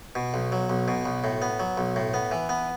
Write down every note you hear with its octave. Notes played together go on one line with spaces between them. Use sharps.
B2
B1
F#3
B1
B2
B1
A2
B3
F#3
B1
A2
B3
E3
B3